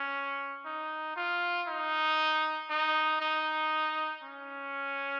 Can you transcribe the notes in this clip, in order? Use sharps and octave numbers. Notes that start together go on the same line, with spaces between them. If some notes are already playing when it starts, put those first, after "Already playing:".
Already playing: C#4
D#4
F4
D#4
D#4
D#4
C#4